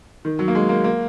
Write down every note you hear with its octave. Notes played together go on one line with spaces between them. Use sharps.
D#3
F#3
A#3
G#3
A#3
A#3